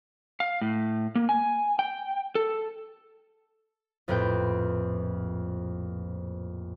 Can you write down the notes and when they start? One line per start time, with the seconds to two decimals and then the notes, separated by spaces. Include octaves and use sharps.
0.40 F5
0.61 A2
1.15 A#3
1.29 G#5
1.79 G5
2.35 A4
4.08 A#1 F2 A2 C4 B4 G5